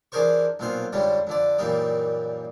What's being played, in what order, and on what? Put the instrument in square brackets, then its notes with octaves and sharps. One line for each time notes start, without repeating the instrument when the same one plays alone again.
[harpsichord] E3 D4 G#4 A#4 C5 C#6
B1 A#2 F#3 B3 C5 F5
F2 G#2 D3 G3 C#4
F2 D3 D5
F#2 A#2 E3 G3 A#3 D#4